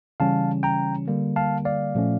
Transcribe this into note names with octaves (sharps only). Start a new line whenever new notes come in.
C#3 E3 G3 C#4 F5 A5
G5 A#5
D3 G3 A#3
F5 A5
D5 F5
A#2 F3 A3 C#4